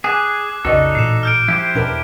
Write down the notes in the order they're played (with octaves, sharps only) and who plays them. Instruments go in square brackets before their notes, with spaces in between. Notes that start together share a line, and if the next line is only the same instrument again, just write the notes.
[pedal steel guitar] G#4 [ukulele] G#5 [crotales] D6 F#6 C7
[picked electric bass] B1 F2 C#3 [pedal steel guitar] D#4 A4 [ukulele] F#4 D5 D#5
[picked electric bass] A1 A#2 [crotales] C7 E7
[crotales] F6 G6 D7
[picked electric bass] F3 [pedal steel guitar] E4 G4 C5
[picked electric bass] E2 B2 [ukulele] D4 A#4 B4